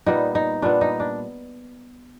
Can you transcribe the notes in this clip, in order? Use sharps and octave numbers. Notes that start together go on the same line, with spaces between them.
A#2 G3 B3 D#4
D#4
A#2 G3 B3 D4
D#4
D4